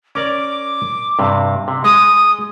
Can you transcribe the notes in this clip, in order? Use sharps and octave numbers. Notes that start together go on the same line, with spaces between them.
C#4 A#4 D5 D6
G2 C3
C3
G#3 D#6